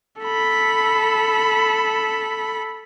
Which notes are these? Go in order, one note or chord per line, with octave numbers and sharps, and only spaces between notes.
A4 B5